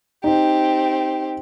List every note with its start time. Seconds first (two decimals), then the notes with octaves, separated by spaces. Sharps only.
0.24 C4 D#4 G4